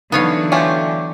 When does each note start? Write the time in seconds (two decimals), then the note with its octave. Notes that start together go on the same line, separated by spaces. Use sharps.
0.12 D3 E3 F#3 B3 D#4 C#5 F5 C#7
0.52 A3 C#4 F4 G5 D6 G6